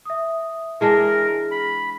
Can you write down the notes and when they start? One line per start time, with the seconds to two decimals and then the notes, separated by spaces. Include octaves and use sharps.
0.05 E5 D#6
0.81 E3 G#3 D4 G#4 A#4 A#6
1.51 B5